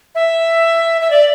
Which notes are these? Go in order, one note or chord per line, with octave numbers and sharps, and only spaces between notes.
E5
E5
D5